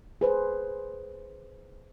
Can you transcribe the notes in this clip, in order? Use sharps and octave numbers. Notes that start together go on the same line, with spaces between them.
G#4 B4 C5